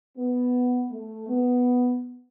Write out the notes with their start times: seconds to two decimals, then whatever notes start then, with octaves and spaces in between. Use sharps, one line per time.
0.17 B3
0.91 A3
1.27 B3